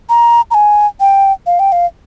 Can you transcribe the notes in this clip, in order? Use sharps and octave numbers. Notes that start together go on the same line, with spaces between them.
A#5
A#5
G#5
G5
F5
G5
F5